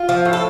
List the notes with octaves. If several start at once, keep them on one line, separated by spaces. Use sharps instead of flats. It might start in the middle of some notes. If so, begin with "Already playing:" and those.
Already playing: F4
F3
A2
A4